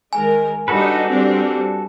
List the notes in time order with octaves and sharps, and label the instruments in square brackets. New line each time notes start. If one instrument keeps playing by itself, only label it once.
[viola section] D#3 G#3 A#4 [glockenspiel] G#5
[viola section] G3 D4 D#4 [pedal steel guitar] F#4 A4 B4
[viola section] G3 C4 D4